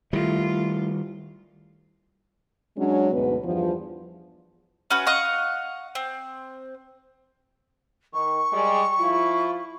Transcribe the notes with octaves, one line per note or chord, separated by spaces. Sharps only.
D#3 G3 A3 E4 F4
F#3 G#3 C#4 D4
D2 G#2 B2 B3 B4
E2 G2 F3
C#4 F#4 B4
D#5 F5 F#5 C#6
C4
D#3 C#6
G3 G#3
F3 E4 F4